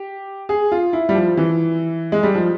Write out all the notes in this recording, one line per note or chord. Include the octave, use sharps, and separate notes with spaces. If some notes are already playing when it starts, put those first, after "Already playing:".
Already playing: G4
G#4
F4
E4
G3
F3
E3
G#3
G3
F3